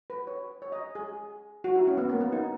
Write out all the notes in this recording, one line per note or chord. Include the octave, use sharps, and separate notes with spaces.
B4
C#5
C#5
D#5
G#4
F#4
E4
C#4
B3
A#3
B3
D#4